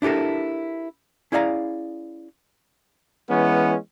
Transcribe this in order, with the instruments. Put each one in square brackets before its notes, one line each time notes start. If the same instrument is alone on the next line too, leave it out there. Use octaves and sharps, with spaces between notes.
[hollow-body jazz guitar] D4 E4 G4 A4 A#4
C#4 E4 G#4 D5 F5 A#5
[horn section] E3 G#3 B3 C#4